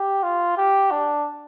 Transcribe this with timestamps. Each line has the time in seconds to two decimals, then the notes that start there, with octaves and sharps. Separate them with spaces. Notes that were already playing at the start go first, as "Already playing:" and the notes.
Already playing: G4
0.23 F4
0.58 G4
0.91 D4